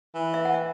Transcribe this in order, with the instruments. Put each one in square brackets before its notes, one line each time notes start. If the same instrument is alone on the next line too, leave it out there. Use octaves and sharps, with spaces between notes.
[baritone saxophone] E3
[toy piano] E5
F#5
E5